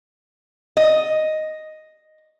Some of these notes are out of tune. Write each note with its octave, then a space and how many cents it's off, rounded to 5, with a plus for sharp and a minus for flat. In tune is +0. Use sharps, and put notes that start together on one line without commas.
D#5 +0